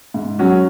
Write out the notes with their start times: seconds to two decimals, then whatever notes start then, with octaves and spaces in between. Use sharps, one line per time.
0.14 G#2
0.39 F#3 C#4 F#4